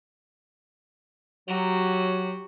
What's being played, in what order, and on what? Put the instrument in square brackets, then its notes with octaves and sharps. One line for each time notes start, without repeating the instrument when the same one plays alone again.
[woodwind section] F#3 [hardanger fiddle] F#4 G4